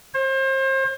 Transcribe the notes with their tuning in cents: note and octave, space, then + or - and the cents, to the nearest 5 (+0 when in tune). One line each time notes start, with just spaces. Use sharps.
C5 +35